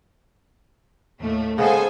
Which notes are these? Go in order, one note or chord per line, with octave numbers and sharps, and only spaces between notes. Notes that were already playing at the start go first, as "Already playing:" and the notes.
D#2 A2 A3
C#3 G#3 B3 A4 C5 G#5